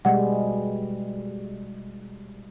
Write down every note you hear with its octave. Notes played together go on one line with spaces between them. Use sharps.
B2 G3 G#3 F#5